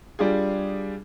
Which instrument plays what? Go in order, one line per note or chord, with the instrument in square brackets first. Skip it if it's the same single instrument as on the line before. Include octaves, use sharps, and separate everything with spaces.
[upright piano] G3 D4 F4 G#4